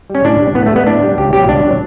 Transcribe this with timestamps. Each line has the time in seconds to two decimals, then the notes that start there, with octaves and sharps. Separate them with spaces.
0.10 G3
0.15 C#4
0.24 A2 D4
0.40 G3
0.55 A2 B3
0.66 A3
0.71 G3 B3
0.86 A2 D4
1.02 G3
1.18 C#2 G4
1.33 B2 F#3 G4
1.48 C#2 D4
1.63 B2 F#3